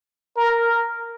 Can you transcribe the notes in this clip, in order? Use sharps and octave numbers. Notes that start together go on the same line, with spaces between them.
A#4